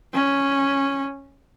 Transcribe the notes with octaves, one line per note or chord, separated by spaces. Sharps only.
C#4